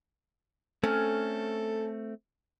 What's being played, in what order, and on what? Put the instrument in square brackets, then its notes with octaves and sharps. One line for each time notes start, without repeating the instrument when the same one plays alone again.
[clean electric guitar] A3 C4 [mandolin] C#4 [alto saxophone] A4